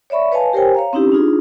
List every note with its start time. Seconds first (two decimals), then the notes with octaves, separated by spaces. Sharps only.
0.10 C#5 D5 E5 B5 C#6
0.32 B4 C#5 D#5 F5 G#5 A5
0.53 G4 A#4 C5 C#5 G5 G#5
0.75 C#5 F5 A#5
0.93 C4 C#4 D#4 E4 G4
1.12 D4 D#4 F4 G#4